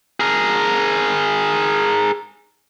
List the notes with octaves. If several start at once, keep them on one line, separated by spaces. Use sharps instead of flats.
G#4 A#4